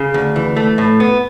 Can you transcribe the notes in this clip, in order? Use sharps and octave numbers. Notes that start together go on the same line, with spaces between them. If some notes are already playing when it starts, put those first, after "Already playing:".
Already playing: C#3
D2
E3
A3
A2
B3